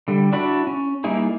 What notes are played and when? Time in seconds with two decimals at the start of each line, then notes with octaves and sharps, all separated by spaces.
0.08 D3 G3
0.32 D4 E4 F#4 D5 B5
0.67 C#4
1.04 G3 A#3 D#4 E4 G#4